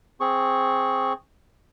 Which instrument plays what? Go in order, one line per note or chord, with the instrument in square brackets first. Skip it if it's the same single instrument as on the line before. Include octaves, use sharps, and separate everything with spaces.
[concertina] C4 G#4 C#6